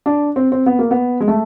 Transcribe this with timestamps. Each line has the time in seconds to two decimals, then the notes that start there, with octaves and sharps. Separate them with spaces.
0.06 D4
0.36 C4
0.52 C4
0.66 B3
0.79 A#3
0.91 B3
1.20 G#3
1.28 A3